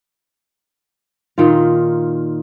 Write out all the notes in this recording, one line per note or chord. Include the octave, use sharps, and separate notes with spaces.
A#2 D#3 F4